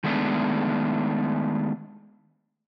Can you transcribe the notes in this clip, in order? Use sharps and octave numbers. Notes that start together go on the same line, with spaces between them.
D#3 G#3 A3 B3 D4